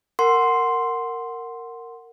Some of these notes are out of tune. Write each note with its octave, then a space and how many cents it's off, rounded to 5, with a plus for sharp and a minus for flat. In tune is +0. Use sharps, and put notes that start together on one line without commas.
A#4 -10 F#5 +0 C6 +0